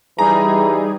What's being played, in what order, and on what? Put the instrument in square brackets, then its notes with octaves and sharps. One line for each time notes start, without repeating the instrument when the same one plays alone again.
[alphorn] E3 [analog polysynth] G3 D#4 G#4 [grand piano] A#5